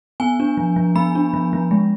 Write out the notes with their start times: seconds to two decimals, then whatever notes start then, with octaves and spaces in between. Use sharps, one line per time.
0.20 B3 G#5
0.40 D4
0.57 F3
0.76 F3
0.95 B3 B5
1.15 D4
1.34 F3
1.53 F3
1.71 G#3